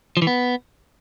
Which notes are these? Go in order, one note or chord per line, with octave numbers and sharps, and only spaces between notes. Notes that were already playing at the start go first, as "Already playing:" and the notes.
F3
E3
B3